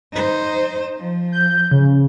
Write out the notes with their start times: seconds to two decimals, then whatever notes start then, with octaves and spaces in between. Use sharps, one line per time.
0.13 D#4 C5
0.98 F3
1.32 G6
1.71 C#3